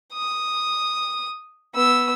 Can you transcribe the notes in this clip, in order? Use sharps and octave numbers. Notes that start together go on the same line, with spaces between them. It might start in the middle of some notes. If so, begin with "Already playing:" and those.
D#6
B3 E6